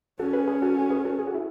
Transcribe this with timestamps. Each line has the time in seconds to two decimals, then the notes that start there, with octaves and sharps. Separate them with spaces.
0.19 C#4 F#4 A4
0.33 G#4 B4
0.48 G#4 B4
0.62 F#4 A4
0.76 F#4 A4
0.90 G#4 B4
1.05 F#4 A4
1.19 G#4
1.27 F#4
1.34 E4 G#4